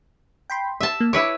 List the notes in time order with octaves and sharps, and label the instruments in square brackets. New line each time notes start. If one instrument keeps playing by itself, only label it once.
[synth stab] G5 B5 C6
[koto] E5 A5
[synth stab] A#3
[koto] E4 B4 C#5 [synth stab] D6 C#7 D7